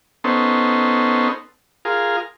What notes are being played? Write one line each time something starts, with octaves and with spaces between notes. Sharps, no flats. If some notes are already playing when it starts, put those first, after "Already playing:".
B3 C#4 D#4 A4 C5
F4 G#4 A#4